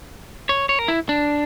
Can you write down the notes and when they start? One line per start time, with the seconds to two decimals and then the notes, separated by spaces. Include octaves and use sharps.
0.49 C#5
0.69 C#5
0.79 A#4
0.88 E4
1.09 D4